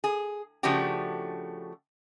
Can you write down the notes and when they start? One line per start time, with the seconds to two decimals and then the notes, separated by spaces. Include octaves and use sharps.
0.04 G#4
0.63 C#3 F3 A3 D4 F#4 G4